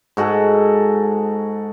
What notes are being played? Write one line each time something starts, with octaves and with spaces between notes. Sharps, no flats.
G#2 F#4 G#4 A4